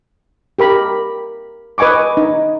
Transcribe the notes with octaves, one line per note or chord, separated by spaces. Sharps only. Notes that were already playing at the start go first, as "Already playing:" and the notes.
G4 A#4 B5
B4 D#5 G#5 C#6 D6
D#4